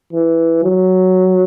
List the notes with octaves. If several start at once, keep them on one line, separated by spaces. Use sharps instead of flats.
E3
F#3